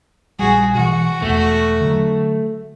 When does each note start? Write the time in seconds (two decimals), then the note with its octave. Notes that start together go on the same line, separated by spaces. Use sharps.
0.39 A#1 G3 F#4 G#4
0.75 B2 E3 F#4
1.22 E1 E2 A3
1.81 D3 F#3